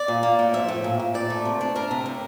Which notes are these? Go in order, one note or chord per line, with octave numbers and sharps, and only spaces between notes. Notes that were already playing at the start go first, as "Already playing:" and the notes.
Already playing: D5
A#2
A#3
A2
F3 E5
A2
A#2
A#2
A#2 D5
A3
C3
D4
D4 A#4
C3
A2